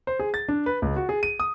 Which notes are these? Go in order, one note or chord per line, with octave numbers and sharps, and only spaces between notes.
C5
G#4
A6
D4
B4
C#2
F#4
G#4
D#7
D#6